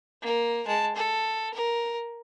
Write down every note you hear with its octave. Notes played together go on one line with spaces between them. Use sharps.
A#3 A#4
G#3 A5
A4
A#4